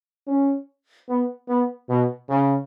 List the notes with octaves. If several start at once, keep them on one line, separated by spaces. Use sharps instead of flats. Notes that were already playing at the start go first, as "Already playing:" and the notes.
C#4
B3
B3
B2
C#3